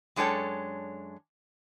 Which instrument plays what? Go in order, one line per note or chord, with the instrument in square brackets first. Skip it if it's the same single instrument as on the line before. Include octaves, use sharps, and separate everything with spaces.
[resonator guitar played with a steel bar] F#2 G#3 D4 A4 C#5 G5